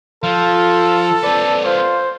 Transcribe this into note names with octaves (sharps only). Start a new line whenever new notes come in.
F3 F4 A4
C4 B4 D5
F4 C5